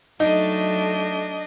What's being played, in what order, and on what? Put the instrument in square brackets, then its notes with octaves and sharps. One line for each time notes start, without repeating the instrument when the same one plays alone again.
[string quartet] F#3 A3 [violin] D4 D#5 [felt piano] D#4